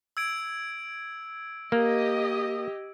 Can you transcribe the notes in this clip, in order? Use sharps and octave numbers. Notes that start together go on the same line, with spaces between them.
E6 G#6 D7
A#3 G4 D#5